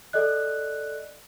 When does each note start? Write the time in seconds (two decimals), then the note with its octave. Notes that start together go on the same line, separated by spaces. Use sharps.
0.13 A4 D5 D#5 F#6